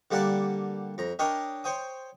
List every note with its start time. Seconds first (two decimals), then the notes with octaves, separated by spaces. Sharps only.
0.11 D3 G3 A#3 D5 F#5 A5
0.98 F2 A#5
1.19 D4 A#4 C#5 D#5 G5
1.64 C5 C#5 G5 D#6